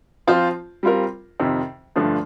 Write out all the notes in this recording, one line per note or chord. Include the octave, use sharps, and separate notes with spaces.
F3 C4 F4 C5
G3 C4 F4 A#4
F2 C3 D#3
G2 D3 F3 A3 D4